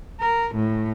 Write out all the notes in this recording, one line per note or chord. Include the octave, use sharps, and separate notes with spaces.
A#4
A2